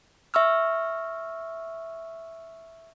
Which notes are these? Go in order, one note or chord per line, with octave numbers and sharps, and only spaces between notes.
E5 C#6 E6 F6